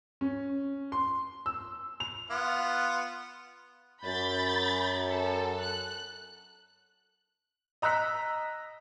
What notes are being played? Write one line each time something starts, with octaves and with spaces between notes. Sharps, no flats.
C#4
C6
E6
F7
B3 F4 F#5
F#2 B5 G6 A6
A4
F#6
D#5 A#5 E6 F#6 B6